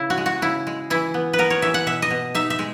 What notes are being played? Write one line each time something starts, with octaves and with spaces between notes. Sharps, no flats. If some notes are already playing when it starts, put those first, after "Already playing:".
Already playing: C#3 E4
F#4
G#3
F#4
C#3 E4
G#3
E3 E4
B3
B4
B3 A#4
C#5
E3 E5
F#5
B2 E5
D#5
B2
D#4 E5
E5
G#3